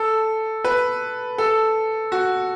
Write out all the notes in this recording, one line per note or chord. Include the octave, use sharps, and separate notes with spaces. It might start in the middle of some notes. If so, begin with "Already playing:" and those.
Already playing: A4
B4
A4
F#4